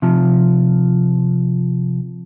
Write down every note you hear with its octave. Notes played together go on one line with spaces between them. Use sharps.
C3 F3